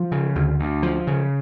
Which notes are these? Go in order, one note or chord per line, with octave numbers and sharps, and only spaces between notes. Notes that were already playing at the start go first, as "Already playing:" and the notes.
Already playing: F3
C#3
D2
D2
F3
C#3